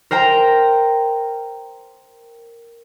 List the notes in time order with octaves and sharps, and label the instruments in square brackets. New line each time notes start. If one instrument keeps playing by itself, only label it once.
[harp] A#4 C5 G5 A#5